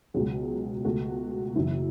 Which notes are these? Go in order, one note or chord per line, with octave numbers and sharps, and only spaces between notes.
C#2 B2 F#3 G#4
C#2 B2 A3 F#4
F#1 F#2 E3 E4